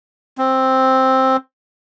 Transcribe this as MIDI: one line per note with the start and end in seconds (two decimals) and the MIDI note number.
0.38 1.37 60